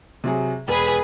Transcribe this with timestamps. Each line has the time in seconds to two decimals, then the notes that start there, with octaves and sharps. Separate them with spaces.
0.24 C3 F#3 G#4
0.68 E1 G#4 B4